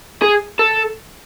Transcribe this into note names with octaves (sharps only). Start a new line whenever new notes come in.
G#4
A4